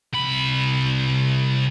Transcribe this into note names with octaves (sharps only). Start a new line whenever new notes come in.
C2 B5